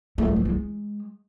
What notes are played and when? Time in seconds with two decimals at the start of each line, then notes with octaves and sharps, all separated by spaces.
0.18 A3
0.27 F3
0.36 E3
0.45 G#3